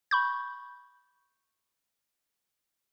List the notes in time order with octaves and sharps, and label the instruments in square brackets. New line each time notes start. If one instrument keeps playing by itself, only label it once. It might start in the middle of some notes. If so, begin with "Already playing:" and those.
[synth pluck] B5 C#6 G6